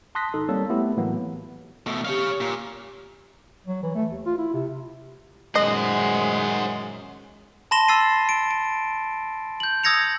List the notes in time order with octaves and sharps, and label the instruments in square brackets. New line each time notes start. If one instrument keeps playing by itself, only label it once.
[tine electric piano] A5 C6 D#6 F#6 A#6 B6
G#1 D#4 A4
G3 A#3 C4 A4 C#5
A3 B3 E4 G4 A4
A2 E3 F#3 A#3 B3
[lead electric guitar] B2 A3
[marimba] G4 F6 [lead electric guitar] C#5 F5
[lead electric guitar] A#2
[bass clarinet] F#3
E3
A3
D#2
F4
E4
C3
[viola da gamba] F#2 A#2 D#3 [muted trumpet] G#3 [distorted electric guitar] C5 F#5 [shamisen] D#5
[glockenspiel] A5 B5 C6 A#6 E7 G7
E6 A6 C7 D#7
D7
D7
G6 F#7
D#6 E6 G#6 A#6 C#7 F7